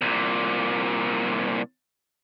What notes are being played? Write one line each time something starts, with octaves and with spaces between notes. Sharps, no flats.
C2 A#2